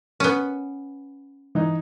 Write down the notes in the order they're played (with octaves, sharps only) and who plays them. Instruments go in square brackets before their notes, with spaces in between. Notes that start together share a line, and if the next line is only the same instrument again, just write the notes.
[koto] B3 C#4
[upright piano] E3 D#4